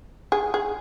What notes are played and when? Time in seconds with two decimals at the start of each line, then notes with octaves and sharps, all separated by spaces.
0.32 G#4
0.54 G#4